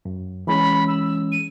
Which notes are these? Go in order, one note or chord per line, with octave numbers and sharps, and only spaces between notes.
F#2
E3 G#3 C#4 B5
E6
D#7